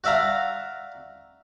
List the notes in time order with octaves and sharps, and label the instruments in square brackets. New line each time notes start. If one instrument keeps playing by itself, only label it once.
[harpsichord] F#4 D5 E5 F5 A#5